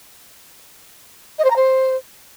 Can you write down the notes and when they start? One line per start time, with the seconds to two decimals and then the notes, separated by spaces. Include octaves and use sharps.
1.38 D#5
1.44 C5
1.50 A#5
1.56 C5